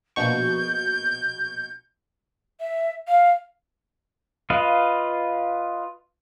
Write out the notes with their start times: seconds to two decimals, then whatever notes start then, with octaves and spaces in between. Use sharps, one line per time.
0.16 A#1 B2 C#6 G6
2.60 E5
3.08 F5
4.50 F4 B4 D#5 F5